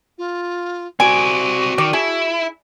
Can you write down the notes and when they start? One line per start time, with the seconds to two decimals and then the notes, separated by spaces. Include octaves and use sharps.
0.18 F4
1.00 C4 F#4 D5 G#5
1.78 D#3 D5
1.93 E4 G#4